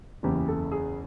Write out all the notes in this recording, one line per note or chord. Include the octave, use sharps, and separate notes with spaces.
F#1 E2 C#3 E3 G4
A4
G#4